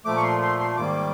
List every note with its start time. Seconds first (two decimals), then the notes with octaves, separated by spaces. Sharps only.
0.05 A#2 F3 A3 D6
0.17 C#6
0.23 C6
0.41 C6
0.59 C6
0.77 G#2 D#3 G3 A#3 D6